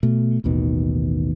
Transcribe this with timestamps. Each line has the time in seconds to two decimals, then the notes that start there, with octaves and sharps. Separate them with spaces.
0.03 B2 A3
0.44 A1 D#2 B2 D#3